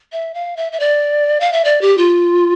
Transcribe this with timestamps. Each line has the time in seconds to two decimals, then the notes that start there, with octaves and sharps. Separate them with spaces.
0.12 E5
0.34 F5
0.57 E5
0.72 E5
0.80 D5
1.40 F5
1.52 E5
1.65 D5
1.81 G4
1.98 F4